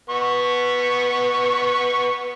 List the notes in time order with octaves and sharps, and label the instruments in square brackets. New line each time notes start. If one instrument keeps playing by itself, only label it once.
[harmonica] B3 C#6